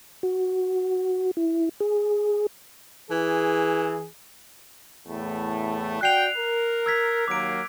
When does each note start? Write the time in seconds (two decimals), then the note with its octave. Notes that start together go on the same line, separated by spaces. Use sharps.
0.23 F#4
1.37 E4
1.80 G#4
3.11 E3 G#4
5.07 E2 A2 A3
6.01 F#4 D5 G5 F#6 C7 F7
6.37 A#4
6.86 E6 G#6 B6
7.28 D#2 F#3 A#3 D6 D7